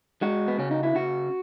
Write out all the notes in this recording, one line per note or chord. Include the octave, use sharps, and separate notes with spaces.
G#3 F#4
B3
C#3 C#4
D#4
E4
C#3 F#4